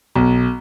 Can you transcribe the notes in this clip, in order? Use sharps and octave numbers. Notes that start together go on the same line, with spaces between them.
B1